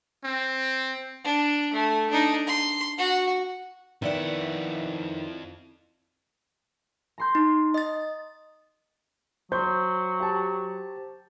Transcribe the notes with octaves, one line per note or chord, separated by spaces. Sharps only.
C4
D4
A3
D4 D#4
C6
F#4
F2 D#3 B3 E4 D5 E5 F#5
A#5 C6 G6
D#4
D#5 A6
F#3 C5 C6 C#6 G6
G4 A5